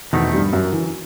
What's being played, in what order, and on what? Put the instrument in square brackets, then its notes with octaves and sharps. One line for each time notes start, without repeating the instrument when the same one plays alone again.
[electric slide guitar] E2 D#3 A3 C4 [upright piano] B2 B3
[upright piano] G2 G3
F#2 F#3
E3